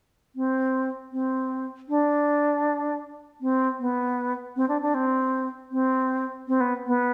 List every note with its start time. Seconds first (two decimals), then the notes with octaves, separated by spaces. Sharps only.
0.36 C4
1.12 C4
1.89 D4
3.41 C4
3.80 B3
4.56 C4
4.69 D4
4.82 D4
4.94 C4
5.72 C4
6.48 C4
6.61 B3
6.87 B3